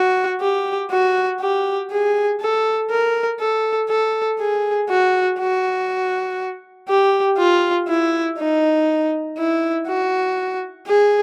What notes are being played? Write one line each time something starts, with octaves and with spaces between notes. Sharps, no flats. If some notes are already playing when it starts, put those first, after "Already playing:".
Already playing: F#4
G4
F#4
G4
G#4
A4
A#4
A4
A4
G#4
F#4
F#4
G4
F4
E4
D#4
E4
F#4
G#4